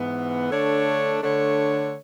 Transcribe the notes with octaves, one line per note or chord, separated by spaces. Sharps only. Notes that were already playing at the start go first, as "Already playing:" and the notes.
Already playing: G#2 E3 B3
D3 A3 D4 A4 C#5
D3 A3 D4 A4 C#5